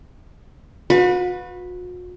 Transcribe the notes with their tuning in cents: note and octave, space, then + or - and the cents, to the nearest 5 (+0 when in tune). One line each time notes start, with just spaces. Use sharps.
F#4 -45 B4 +0